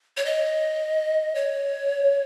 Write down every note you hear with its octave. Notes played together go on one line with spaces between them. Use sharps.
C#5
D#5
C#5